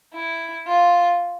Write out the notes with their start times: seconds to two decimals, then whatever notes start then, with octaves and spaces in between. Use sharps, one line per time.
0.14 E4
0.67 F4